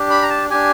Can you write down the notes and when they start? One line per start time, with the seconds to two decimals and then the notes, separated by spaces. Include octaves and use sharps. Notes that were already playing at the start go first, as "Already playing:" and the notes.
Already playing: D4 G4
0.10 B5
0.22 A#5
0.30 A5
0.50 D4 G4 G#5